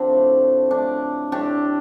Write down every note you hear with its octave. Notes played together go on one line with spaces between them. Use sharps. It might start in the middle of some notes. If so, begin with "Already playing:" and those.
Already playing: D3 F3 C4 D4 G4 C5
A2 A3
A2 A3 D4
A2 A3 D4 G4